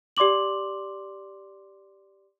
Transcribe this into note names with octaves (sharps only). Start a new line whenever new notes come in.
G4 D5 C6 D6 F#7